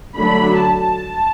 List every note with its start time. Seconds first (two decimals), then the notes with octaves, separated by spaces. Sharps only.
0.17 D3 F#3 A3 D4 B5
0.62 A5